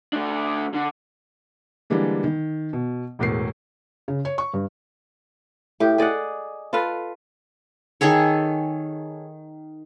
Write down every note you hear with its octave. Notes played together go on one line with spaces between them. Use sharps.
A3 D4
D3
D3 E3 G3 G#3 A#3 D4
D#3
B2
E1 E2 A2 A#4 C7
C#3
C#5
C#6
G2
A2 G4
G#4 D5 D#5 F#5
F4 A4 B4 F5
D#3 G#4 A4 C#5